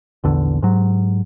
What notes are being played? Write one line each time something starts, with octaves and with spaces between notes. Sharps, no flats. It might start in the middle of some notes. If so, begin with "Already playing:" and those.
A#1 E2 D3
G#2 F#3